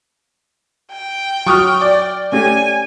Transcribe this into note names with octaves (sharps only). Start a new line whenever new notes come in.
G5
F#3 C#6 D#6 F6
D5
A3 C#4 G4 G#5